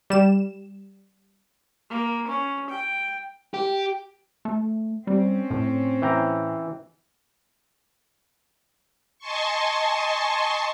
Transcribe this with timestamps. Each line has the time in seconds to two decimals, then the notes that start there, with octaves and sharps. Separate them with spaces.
0.10 G3 E7
1.90 A#3
2.28 C#4
2.70 G5
3.54 G4
4.45 A3
5.07 G3 C4 C#4
5.51 A2
6.02 E3 G5 A#5
9.18 D#5 G#5 A5 C6 C#6